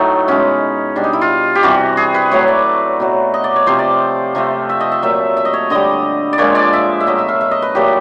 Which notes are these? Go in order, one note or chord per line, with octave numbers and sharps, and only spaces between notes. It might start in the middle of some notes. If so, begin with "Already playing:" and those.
Already playing: A2 F#3 A3 D#4
B2 G#3 C#4
B2 G3 D4
D#4
E4
F4
G4
C3 E3 G3 F#4
G#4
B4
A2 F#3 A3 C#5
D5
B2 F#3 A3
D#5
D5
C#5
C3 F3 A3 C5
D5
C3 F3 A3
E5
D#5
E5
A#2 F#3 A3 E5
E5
D#5
C#5
D3 G3 D#5
D5
A#2 F3 G#3 C#5
D5
E5
E5
B2 F#3 A3 D#5
E5
F5
E5
D#5
B4
A#2 F#3 A3 G4